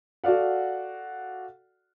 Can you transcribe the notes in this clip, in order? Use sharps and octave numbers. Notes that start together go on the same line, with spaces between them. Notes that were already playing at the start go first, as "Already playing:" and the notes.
F#4 A4 D5 F5 F#5